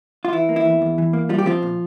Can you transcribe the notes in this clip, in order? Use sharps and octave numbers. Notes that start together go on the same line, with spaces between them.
F4
E3 E4
A#3
E4
E2
E2
E3
A#3
G3 F4
G4
F3 C4 F4
A#2